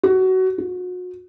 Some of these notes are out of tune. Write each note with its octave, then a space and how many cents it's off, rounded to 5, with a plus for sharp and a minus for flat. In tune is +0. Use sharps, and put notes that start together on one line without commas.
F#4 +20
F#4 -35